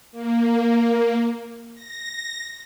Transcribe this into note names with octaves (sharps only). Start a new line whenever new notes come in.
A#3
A#6